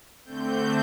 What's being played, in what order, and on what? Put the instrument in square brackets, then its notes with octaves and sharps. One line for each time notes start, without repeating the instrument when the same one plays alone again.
[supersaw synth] D3 A3 C4 G6